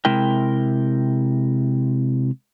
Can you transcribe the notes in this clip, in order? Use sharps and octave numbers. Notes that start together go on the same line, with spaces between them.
C3 G#3 E4 A#4 G5